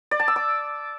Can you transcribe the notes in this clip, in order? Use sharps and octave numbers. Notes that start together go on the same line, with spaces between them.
D5
A5
E6
D6